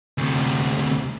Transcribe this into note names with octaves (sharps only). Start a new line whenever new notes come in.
D2 C3